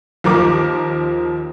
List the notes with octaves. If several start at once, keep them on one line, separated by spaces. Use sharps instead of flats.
D#2 F3 A#4 D6